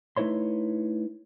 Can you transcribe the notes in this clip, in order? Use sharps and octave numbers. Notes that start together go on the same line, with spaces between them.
A3 D#4 E4 B4 C#5 C6